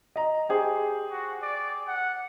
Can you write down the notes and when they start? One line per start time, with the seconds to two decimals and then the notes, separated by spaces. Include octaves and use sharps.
0.16 D#5 A#5
0.49 G4 G#4 C5
1.11 F#4
1.42 D5
1.88 F#5